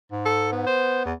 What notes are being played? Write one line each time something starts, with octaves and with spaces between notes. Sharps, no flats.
G#2
A4
B3
C5
E2